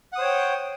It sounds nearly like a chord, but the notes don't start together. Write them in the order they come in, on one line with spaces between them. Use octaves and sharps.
F#5 D#6 C5 C#5 G5